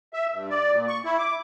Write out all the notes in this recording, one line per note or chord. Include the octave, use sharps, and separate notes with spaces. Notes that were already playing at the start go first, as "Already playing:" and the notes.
E5
G2
D5
A#2
C#6
E4
D6